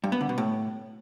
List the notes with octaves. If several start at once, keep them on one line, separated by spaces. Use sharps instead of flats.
G2
B3
D3
B2
A2